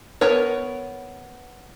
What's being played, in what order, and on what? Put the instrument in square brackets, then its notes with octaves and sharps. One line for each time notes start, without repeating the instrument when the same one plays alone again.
[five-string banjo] B3 A#4 C#5